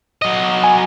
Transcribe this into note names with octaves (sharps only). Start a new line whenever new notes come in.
F#3 D#5
G#5